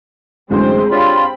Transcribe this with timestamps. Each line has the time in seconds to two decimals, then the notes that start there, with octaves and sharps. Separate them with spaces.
0.50 A1 F#2 D3 G#3 C4 C5
0.91 C4 D4 F4 G4 C#5 B5